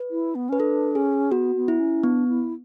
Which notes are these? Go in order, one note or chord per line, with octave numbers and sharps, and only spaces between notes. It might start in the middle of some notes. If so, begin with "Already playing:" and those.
Already playing: B4
E4
B3
C#4 B4
D4 A4
C#4 G#4
B3 F#4
B3
E4
C#4
B3 D4
E4